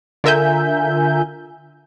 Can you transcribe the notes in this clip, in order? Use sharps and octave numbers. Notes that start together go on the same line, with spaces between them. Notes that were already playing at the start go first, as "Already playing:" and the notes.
D3 F4 A#4 E5 G#5 G6